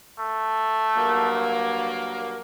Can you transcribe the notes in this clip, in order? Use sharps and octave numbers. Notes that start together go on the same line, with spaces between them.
A3
G2 F#3 A#3